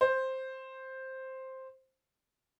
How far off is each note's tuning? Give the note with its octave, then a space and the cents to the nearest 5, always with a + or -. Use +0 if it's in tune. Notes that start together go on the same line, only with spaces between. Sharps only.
C5 +5